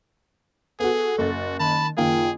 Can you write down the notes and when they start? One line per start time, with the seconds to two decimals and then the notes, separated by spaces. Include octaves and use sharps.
0.80 B3 F#4 G#4 A4
1.18 F#1 F#4 A6
1.60 D#3 A5 B5
1.97 F#1 D#3 A#3 F4 G#4 G5